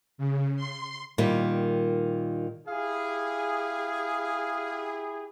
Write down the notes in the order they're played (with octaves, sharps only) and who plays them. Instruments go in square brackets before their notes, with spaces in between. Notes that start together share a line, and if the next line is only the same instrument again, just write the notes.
[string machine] C#3
C6
[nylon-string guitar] A#2 D#3 G3
[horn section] E4 G4 G#4 [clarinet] F5